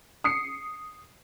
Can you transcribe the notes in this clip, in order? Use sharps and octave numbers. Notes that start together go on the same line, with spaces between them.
D#6 C7 C#7